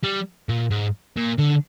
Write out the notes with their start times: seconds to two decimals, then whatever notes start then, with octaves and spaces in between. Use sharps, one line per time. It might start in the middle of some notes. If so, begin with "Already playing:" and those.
0.04 G3
0.49 A#2
0.71 G#2
1.17 A#2
1.39 D3